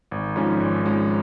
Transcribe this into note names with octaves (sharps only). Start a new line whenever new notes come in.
G#1
G#2 F3 G#3 C#4
G#1
G#2 F3 G#3 C#4